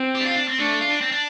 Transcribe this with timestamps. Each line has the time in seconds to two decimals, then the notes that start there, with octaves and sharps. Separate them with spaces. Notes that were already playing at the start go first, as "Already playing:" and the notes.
Already playing: C4
0.15 G4
0.21 D4
0.26 F4
0.36 D4
0.48 C4
0.59 A3 D4
0.81 F4
0.91 D4
1.01 C4
1.12 D4